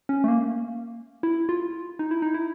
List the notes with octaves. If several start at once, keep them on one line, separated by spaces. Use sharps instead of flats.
C#4
A3
A#3
E4
F4
D#4
E4
D#4
E4